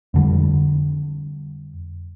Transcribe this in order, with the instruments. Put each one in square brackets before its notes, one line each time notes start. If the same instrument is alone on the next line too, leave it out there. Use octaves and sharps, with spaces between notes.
[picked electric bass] F2 D3 G3